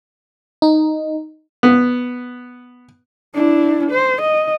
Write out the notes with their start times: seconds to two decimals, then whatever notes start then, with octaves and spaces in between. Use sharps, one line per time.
0.62 D#4
1.63 B3
3.34 D4 E4
3.91 C5
4.21 D#5